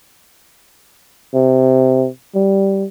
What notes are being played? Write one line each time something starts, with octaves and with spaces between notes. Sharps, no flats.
C3
G3